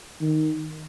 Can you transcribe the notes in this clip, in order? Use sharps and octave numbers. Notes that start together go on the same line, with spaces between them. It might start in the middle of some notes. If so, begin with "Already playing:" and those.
D#3